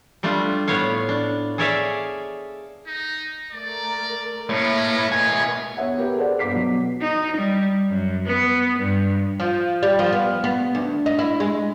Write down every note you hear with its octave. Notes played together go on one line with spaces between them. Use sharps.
G3 A3 D4 F4
A2 B3 C#5 F5
D4
G#4 A4 C#5 D5 E5 F5
D#4
A3 A#4 D5
A2 A#3 C#4 E4 B4
B2 C#5 G#5
E2 C#5 E5 F#5
G4 A#4 B4
G#4 A4 B4 C5 D5 F#5
G2 B3 D6 B6 C7
B2 F#3
D#4
G3
F#2
B3
G2
F3
G3
F3
B3
B3
D2
D#4
E4
G#3